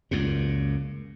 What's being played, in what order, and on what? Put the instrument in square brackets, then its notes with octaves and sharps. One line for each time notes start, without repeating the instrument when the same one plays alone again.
[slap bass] C#2 F#2 A#2